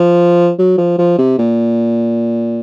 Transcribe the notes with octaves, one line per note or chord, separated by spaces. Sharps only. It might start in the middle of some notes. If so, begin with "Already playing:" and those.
Already playing: F3
F#3
F3
F3
C3
A#2